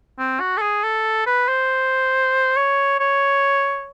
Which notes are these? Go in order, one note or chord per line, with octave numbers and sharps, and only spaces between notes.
C4
F#4
A4
G#4
A4
B4
C5
C#5
C#5